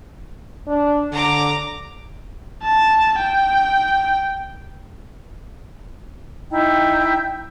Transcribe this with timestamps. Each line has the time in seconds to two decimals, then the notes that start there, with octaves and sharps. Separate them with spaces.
0.67 D4
1.12 D3 A#5 D6
2.64 A5
3.20 G5
6.50 D#4 E4 G5